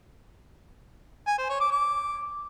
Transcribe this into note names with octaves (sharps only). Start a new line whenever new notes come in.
G#5
C5
C#5
D6
D6